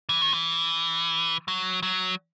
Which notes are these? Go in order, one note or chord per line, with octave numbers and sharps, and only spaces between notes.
E3
D#3
E3
F#3
F#3